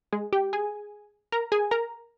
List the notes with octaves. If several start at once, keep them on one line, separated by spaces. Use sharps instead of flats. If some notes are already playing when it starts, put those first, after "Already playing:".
G#3 G#4
G4 G5
G#4 G#5
A#4 A#5
G#4 G#5
A#4 A#5